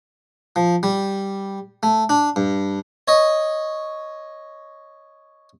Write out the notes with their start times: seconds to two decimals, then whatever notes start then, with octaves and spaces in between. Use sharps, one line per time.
0.56 F3
0.83 G3
1.83 A3
2.09 D4
2.36 G2
3.08 C#5 D#5